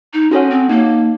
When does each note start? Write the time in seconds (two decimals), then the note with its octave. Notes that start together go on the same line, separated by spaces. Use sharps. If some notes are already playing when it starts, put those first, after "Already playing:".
0.13 D#4
0.31 C#4 F#4 A4 C#5 F#5
0.50 C4
0.69 A#3 D#4